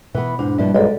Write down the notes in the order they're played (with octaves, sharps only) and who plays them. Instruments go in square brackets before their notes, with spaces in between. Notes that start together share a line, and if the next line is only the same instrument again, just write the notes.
[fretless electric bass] B2 [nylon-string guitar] E3 B3
[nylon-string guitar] E2 G#2 [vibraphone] D4
[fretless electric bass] G2 F3 A#3 [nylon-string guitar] B2 D4 E4 [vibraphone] G3
[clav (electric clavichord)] B1 [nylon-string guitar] G#3 [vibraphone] A4 D5